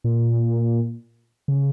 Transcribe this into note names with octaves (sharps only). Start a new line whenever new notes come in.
A#2
C#3